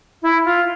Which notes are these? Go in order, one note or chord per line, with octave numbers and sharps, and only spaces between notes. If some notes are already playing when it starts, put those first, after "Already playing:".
E4
F4